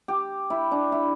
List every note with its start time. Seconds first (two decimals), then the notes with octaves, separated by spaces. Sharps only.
0.08 G4
0.50 E4
0.72 D4
0.92 E4